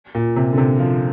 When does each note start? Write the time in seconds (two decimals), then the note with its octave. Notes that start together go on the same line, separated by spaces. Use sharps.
0.15 A#2
0.36 C3
0.53 D3
0.58 C3
0.79 F3